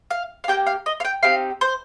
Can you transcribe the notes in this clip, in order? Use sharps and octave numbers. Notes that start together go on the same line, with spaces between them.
F5
F5
A#3 D#4 G4 G5
F5
D#5
F5
G5
C4 D#4 G4 F5
C5